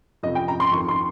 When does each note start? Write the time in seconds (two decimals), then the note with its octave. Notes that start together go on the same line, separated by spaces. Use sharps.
0.23 F2 C3 F3 D#5
0.35 G5
0.48 A#5
0.60 C6
0.72 F2 C#6
0.75 D#3
0.88 C6